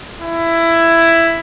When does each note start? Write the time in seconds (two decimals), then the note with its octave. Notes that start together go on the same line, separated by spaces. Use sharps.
0.21 E4